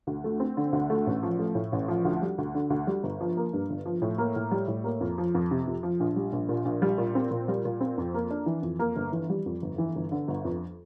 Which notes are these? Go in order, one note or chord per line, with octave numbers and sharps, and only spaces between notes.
D2
A3
C4
D3
D2
A3
A1
F3
A3
A2
A1
F3
D2
G3
D2
D3
D2
G3
G1
F3
A#3
G2
G1
F3
A2
A#3
A2
G3
A2
A#3
F2
F3
F2
C3
F2
F3
A#1
G3
A#1
A#2
A#1
G3
A#2
C4
A#2
G3
A#2
C4
F2
A#3
D4
E3
F2
A#3
G1
E3
G3
F2
G1
E3
G1
D3
G1
F2